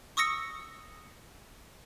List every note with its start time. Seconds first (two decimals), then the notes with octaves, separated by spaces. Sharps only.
0.17 C#6 D#6 E6 A#6 C#7